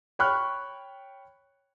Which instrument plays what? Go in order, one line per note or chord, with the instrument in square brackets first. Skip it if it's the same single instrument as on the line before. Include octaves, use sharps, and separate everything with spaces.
[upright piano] C#5 G5 B5 C#6 F6 F#6